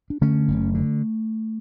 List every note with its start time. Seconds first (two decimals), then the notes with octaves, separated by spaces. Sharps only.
0.10 D4
0.21 D3 A3 C#4
0.48 F#1
0.74 D3